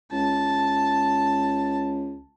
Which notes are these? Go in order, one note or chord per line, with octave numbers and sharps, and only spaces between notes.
C#2 A5